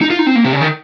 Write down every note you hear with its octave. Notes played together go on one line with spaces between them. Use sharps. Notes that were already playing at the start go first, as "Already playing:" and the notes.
D#4
F4
D#4
C4
A#3
C3
C#3
D#3